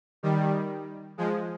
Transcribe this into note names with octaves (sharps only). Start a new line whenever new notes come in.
D#3 G3
F3 G#3